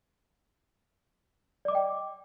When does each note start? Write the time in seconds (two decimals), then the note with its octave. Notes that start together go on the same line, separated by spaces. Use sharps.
1.65 D5
1.68 D6
1.72 D#5
1.75 G5